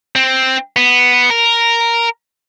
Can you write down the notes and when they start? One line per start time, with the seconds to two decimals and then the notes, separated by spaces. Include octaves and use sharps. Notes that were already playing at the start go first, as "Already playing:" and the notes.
0.16 C4
0.76 B3
1.30 A#4